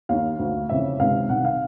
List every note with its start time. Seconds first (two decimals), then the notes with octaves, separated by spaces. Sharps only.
0.09 D#2 D#3 F5
0.39 D2 D3
0.69 F2 C#3 E3 E5
0.99 C#2 C3 D#3 F5
1.29 C2 C3 D#3 F#5
1.45 F5